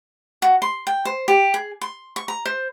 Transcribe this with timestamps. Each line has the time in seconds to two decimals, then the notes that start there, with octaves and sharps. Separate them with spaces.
0.42 F#4
0.62 C6
0.87 G5
1.05 C5
1.28 G4
1.54 G#4
1.81 C6
2.16 C#6
2.28 A#5
2.46 C5